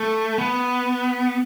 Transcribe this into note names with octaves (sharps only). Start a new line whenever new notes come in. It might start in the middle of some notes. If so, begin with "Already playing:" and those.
Already playing: A3
B3